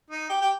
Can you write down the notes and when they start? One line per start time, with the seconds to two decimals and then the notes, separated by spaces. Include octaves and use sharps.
0.10 D#4
0.30 G4
0.42 G4